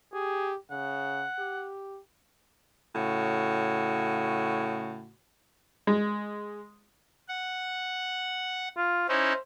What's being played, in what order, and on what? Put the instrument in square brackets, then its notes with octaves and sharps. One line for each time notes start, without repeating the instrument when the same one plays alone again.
[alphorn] G4 [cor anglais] G#4
[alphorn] C#3 [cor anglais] F#5
[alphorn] G4
[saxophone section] A2 C#3 F#4
[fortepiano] G#3
[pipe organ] F#5
[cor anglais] F4
[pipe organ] C#4 D#4 E4 [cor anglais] C5